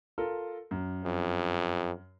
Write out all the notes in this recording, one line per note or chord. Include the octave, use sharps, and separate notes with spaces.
F4 A4 A#4
F#2
F2